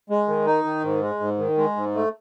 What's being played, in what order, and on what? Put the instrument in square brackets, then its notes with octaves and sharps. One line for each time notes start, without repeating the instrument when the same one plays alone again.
[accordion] G#3
D#3
D#4
D#3
G#2
G#3
G#2
D#3
G#3
G#2
A3